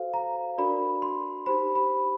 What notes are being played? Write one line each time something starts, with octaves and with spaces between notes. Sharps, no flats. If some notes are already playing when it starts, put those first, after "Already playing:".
Already playing: F#4 A4 C5 F5
A#5
D4 F#4 A#4 D5 B5
C6
D#4 G4 C5 B5
B5